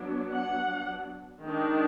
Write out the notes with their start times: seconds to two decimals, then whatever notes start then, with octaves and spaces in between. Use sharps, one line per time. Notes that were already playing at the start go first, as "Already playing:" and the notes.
Already playing: F#3 B3 D4
0.35 F#5
1.45 D#3 G#3 D4